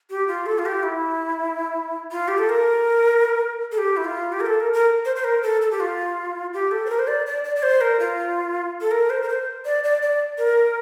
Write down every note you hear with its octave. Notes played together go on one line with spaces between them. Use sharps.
G4
F4
A4
F4
G4
E4
F4
G4
A4
A#4
A4
G4
E4
F4
G4
A#4
A4
A#4
A#4
C5
C5
A#4
A4
A4
G4
F4
G4
A4
C5
A#4
C5
D5
D5
D5
D5
C5
A#4
F4
A4
A#4
C5
A#4
C5
D5
D5
D5
A#4